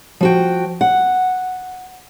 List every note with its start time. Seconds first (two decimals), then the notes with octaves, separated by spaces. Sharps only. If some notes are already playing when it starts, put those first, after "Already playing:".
0.21 F3 F#4 G5
0.81 F#5